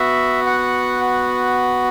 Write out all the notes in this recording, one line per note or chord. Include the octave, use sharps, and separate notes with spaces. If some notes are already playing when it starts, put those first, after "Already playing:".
Already playing: B3 F#4 E5
F#5